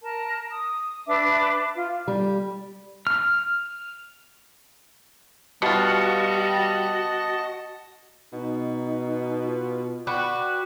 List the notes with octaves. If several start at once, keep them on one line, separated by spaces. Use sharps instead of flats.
A#4 A5
D#6
D4 B4 E5 D6
F4
G3
F6
B2 G3 F4 F#4 D#5 A5
B2 D#4
F4
F#4 B4 D5 G5